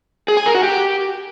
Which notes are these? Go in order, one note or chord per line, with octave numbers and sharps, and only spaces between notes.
G#4
G#5
A#4
F#4
G4